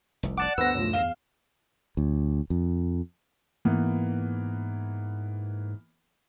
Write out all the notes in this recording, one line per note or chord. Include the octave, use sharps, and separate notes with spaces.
F1 C2
D5 F#5 A5 D6
D2 G2 B3 C5 E6 A#6
F#2 A2 F3
E2 F5 E7 G7
D2
F2
G#2 E3 A#3 B3